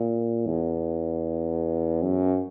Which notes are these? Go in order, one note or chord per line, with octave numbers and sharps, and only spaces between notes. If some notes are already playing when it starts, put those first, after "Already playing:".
Already playing: A#2
E2
F#2